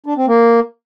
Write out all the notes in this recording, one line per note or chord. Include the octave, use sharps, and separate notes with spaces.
D4
C4
A#3